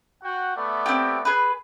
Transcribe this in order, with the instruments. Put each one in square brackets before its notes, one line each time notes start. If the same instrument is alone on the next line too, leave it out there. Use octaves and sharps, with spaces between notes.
[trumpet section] F#4 F#5 G5
A3 B3 D5
[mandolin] C4 G4
G#4 B4